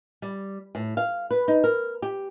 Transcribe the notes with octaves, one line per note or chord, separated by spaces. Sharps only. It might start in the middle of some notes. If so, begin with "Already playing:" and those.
G3
A2
F5
B4
D#4
A#4
G4